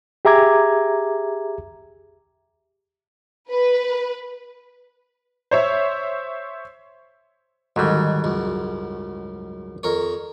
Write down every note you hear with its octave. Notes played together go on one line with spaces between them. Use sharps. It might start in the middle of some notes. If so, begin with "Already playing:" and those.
G4 G#4 E5 A#5 D6 G#6
B4
C5 C#5 E5
D2 G#2 D#3 F#3 G3
C#2 F#2
F2 A#4 C#5